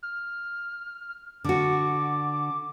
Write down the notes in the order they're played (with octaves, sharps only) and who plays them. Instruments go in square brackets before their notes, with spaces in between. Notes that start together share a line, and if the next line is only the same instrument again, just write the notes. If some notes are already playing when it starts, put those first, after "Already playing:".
[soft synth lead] F6
[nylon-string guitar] D3 F#4 [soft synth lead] D6